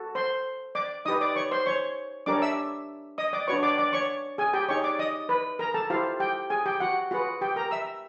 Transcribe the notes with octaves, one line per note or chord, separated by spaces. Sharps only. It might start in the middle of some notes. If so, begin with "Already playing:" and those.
Already playing: F#4 A4
C5 C6
D5 D6
D#4 G4 B4 D#5 D#6
D5 D6
C#5 C#6
C5 C6
C#5 C#6
D4 G4 A#4 C#5 D5 D6
E5 E6
D#5 D#6
D5 D6
D4 F#4 B4 C#5 C#6
D5 D6
D5 D6
C#5 C#6
G#4 G#5
G4 G5
D#4 G#4 C#5 C#6
D5 D6
D#5 D#6
B4 B5
A#4 A#5
A4 A5
E4 F4 G4 C5 F5
G4 G5
G#4 G#5
G4 G5
F#4 F#5
F4 F#4 G#4 B4 F#5
G4 G5
A#4 A#5
E5 E6